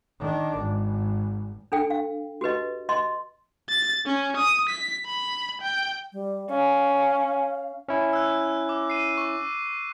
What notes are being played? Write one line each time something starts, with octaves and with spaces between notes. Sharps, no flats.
D#3 D4
G#1
D4 A4 G5
F5
F#4 G4 B4 D#5
D#5 C6
A6
C#4
D#6
B6
B5
G5
G3
C#4 F5
C#4 E4
E6 F#6
D6
C7 D#7
C#6